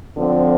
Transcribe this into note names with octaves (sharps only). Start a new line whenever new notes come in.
D3 F3 C4